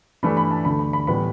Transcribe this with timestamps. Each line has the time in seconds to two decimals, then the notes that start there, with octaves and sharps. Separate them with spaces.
0.23 G2 E3 A3 D4 B5
0.37 B5
0.51 A5
0.65 D2 D3 A3 B5
0.79 B5
0.93 B5
1.07 A2 E3 G3 B3 B5